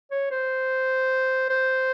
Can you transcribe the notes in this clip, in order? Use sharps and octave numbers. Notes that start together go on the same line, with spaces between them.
C#5
C5
C5